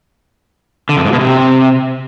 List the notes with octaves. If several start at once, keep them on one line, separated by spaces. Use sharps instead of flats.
D3
F2
G#2
B2
C3